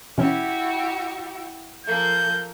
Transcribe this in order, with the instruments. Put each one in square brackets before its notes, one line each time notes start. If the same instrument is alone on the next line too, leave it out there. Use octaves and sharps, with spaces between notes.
[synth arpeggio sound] B2 E3 C#4 [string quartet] E4 F#4 G4
[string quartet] F3 A#3 A4 [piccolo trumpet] G6